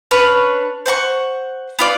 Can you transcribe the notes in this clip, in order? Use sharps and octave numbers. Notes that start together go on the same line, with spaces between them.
C#4 D4 B4 C#5
C5 F#5 A5 C#6
B3 F4 D5